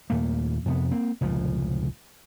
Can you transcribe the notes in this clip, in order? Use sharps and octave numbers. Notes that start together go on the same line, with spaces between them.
D#2 A#2 A3 A#3
F2 C3 B3
A#3 C4
F1 C#2 A#2 F3